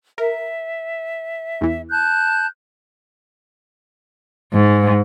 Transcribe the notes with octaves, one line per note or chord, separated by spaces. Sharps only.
A#4 E5
E2 E3
A5 F#6 G6
G#2